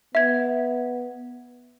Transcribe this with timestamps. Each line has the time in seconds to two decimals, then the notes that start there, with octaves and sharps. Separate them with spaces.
0.15 B3 E5 G#6